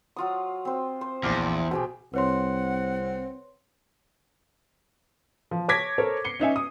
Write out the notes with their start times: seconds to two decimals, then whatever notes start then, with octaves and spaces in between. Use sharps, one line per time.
0.16 F#3 F4 D#6
0.65 C4 C5
1.01 C5
1.23 A#1 E2 D6 F6
1.71 B2 G4 G#4 G5
2.14 C2 C4 B4 C#5 F#5 C6
5.51 F3
5.68 C#5 A5 D6 G#6 A#6 B6
5.98 A4 A#4 C5 C#5
6.25 C7 C#7 G7
6.40 C#4 D#4 E5 G#5
6.56 D#6